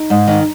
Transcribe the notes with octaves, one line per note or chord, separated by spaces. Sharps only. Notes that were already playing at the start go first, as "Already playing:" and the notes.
Already playing: D#4
G#2
D#3